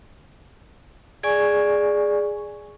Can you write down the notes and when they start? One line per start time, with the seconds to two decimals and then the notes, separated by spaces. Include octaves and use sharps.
1.23 G#4 D5 G#5 C#6